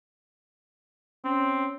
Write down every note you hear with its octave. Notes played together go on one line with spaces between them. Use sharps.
C4 C#4